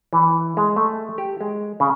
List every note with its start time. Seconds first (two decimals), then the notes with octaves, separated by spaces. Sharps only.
0.13 E3
0.57 G#3
0.76 A3
1.18 G4
1.41 G#3
1.80 C#3